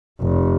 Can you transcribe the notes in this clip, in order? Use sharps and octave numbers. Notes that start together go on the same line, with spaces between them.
F1